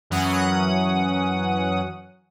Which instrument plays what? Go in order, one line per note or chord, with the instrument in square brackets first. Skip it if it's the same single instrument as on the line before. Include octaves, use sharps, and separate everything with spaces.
[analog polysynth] F#2 E3 F#3 C#4 F#5 D#6